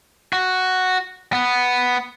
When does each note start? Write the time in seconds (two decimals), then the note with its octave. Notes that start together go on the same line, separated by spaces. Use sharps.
0.33 F#4
1.33 B3